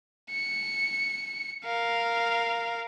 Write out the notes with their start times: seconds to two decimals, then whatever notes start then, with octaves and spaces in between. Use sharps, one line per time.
0.31 C#7
1.65 A#4 F5